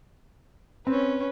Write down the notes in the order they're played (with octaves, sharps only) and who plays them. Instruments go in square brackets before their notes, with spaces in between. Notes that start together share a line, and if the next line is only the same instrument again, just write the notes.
[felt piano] C4 [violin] C#4 B4